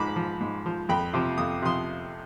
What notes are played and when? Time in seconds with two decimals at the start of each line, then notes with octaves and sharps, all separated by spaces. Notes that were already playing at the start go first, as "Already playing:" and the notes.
Already playing: G#2 F3 B5 D6
0.16 F3
0.41 G#2
0.66 F3
0.89 F2 G5 B5
1.14 C3 F3
1.38 F2 D#6
1.62 C3 F3 C6 D#6